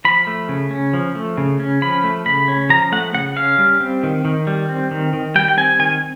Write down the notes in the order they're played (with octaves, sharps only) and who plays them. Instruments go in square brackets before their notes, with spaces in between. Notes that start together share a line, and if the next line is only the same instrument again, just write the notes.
[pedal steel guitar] F3 B5
A3
C#3
C#4
F3
A3
C#3
C#4
F3 B5
A3
C#3 B5
C#4
F3 A#5
A3 F#5
C#3 F#5
C#4 F5
G3
C4
D#3
D#3
G3
C4
D#3
D#3
G3 G5
G5
C4 G#5
D#3 G#5